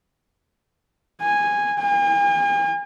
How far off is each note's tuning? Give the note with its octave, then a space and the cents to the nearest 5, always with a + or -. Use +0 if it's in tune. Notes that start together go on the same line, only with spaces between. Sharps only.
G#5 -10
G#5 -45